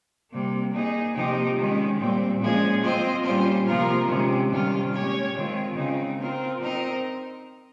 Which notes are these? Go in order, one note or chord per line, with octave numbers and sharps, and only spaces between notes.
C3 G3 A#3
A#3 D#4 G#4
C3 F3 A#3 D#4 G4
D#3 G#3 C#4
A#2 G3 C4
A#2 F3 G#3 C#4 G#4
C4 F4 C5 D#5
A#2 G3 C#4 F4 C5
C3 F3 A#3 F4 A#4
C3 D#3 G#3 C#4
C3 D#3 G3 C#4 F4
A#2 G#3 C#4 G4 C#5
D#3 G#3 C4 F4
C#3 G#3 C4 D#4
C4 F4 A#4
C4 D#4 A#4 D#5